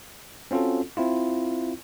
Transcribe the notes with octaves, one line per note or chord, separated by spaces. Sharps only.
C4 C#4 F4 F#4 A4
C4 E4 F4